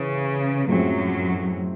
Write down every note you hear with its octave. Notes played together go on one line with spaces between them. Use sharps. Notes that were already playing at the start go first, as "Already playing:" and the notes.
Already playing: C#3 E3
F#2 A2 F3 F#3 G#3 C4 E4